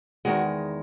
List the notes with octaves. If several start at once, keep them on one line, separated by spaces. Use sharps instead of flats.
E2 D#3 G#3 F#4